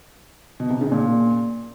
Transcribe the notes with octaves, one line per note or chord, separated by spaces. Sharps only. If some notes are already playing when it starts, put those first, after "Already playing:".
B2
C3
C#3
A#2